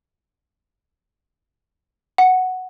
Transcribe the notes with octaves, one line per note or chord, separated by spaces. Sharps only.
F#5